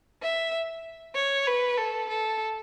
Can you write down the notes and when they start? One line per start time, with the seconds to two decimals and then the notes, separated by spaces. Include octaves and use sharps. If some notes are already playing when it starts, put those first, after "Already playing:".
0.22 E5
1.15 C#5
1.47 B4
1.78 A4
2.09 A4